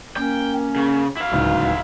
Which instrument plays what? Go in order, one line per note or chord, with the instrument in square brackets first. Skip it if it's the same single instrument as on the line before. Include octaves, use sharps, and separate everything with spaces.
[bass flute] A#3 [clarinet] C#4 [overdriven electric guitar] G5
[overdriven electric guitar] C#3
E4 F5
[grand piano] D1 C#2 [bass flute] D#4